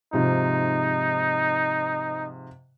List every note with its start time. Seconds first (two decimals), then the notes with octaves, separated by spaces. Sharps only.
0.13 G#2 C3 F3 D#4